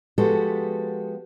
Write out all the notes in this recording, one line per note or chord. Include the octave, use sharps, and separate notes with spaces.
F3 G#3 B3 F#4 G4 A4